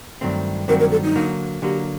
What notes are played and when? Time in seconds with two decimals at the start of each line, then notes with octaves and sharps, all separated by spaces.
0.21 G2 D#3 F#3 A3 C4
0.68 G2 D#3 F#3 A3 C4 A#4
0.80 A#4
0.91 A4
1.04 D#4
1.15 D3 F#3 A#3
1.62 D3 F#3 A#3 G4